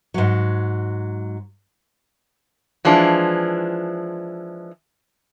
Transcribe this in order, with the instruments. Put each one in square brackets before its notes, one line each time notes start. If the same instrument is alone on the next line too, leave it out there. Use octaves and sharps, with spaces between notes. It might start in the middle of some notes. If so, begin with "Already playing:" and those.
[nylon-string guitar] G#2 F#3
[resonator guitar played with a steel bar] E3 F3 G#3 D4